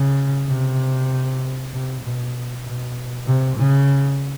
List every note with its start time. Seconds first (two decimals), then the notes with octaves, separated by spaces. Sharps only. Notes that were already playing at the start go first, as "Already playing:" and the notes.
Already playing: C#3
0.48 C3
1.73 C3
2.02 B2
2.65 B2
3.26 C3
3.57 C#3